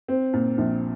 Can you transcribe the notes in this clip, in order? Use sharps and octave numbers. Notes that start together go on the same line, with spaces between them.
C4
A#2
A#1